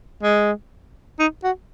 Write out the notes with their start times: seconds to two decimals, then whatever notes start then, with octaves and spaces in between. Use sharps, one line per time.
0.23 G#3
1.20 D#4
1.44 F#4